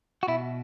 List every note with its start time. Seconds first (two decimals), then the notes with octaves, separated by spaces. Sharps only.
0.23 F#4
0.28 B2 E4